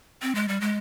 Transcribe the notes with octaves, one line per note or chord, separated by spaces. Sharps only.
C4
G#3
G3
G#3